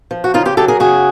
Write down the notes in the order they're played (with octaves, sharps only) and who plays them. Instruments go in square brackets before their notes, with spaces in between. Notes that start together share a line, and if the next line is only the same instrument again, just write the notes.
[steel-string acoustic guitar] F3
F#4
C#3 D#4 F4
F4 G4
F#3 G4 A4
G#4 A#4
C#3 F#4 G#4